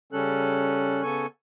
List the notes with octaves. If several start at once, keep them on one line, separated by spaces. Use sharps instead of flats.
C#3 G3 C#4 A4 F#6
C#3 B3 A4 G#5 C#6